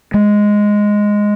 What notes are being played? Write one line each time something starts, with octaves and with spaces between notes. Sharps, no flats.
G#3